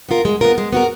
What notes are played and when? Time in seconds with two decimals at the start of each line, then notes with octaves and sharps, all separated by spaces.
0.09 B3 F4 A#4
0.25 G#3
0.41 B3 F4 A#4
0.58 G#3
0.73 B3 F#4 A#4